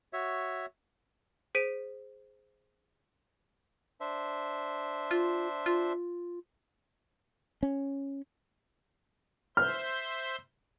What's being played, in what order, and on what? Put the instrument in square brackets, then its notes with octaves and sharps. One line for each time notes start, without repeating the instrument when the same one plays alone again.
[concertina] F#4 C#5 E5
[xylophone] G#4 C5 B6 D7 D#7
[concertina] D4 C5 E5
[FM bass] F4
F4
[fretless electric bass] C#4
[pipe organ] C5 E5 G6 [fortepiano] F6